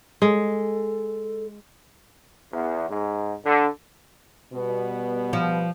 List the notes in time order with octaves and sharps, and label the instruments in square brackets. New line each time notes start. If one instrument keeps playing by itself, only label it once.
[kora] G#3 [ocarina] A4
[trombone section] E2
G#2
D3
[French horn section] B2 G3 B3
[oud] F3